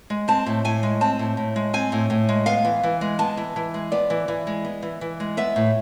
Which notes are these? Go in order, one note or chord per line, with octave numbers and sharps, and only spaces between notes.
G#3
C4 A5
A2
A2 G#5
G#3
C4 A5
A2
A2
G#3
C4 G#5
A2
A2
G#3
B3 F5
E3
E3
G#3
B3 A5
E3
E3
G#3
B3 D5
E3
E3
G#3
B3
E3
E3
G#3
B3 E5
A2